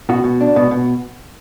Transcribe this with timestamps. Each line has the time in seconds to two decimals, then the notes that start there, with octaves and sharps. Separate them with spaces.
0.09 B2 F#4
0.24 B2
0.41 D4
0.56 B2
0.71 B2